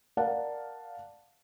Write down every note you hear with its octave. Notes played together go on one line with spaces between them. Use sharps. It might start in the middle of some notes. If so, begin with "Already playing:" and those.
A#4 D5 F5 F#5 A5